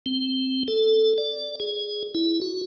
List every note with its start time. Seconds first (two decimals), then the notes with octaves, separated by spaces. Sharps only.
0.06 C4
0.68 A4
1.18 D5
1.60 G#4
2.15 E4
2.42 F#4